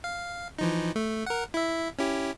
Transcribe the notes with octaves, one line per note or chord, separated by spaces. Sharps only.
F5
E3 F3 D#4
A3
A#4 F#5
E4 E5
C#4 E4 G4